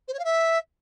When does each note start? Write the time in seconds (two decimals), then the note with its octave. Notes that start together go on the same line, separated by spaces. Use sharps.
0.07 C5
0.13 C#5
0.19 F5
0.24 E5